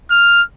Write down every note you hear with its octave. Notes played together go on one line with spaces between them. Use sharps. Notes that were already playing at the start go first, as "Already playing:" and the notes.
F6